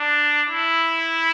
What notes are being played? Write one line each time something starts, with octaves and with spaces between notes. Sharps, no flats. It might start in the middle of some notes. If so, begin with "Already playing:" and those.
Already playing: D4
E4